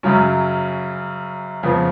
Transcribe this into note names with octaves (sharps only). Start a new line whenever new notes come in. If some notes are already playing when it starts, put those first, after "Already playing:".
F#2 C#3 F#3 C#4
F2 C#3 F3 B3